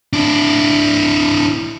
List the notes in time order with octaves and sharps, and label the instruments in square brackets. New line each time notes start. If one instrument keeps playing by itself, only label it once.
[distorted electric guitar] D4 E4